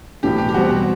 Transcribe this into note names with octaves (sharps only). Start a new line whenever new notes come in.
B1 A2 E3 G4
G4
G4
E2 B2 G3 C4 F#4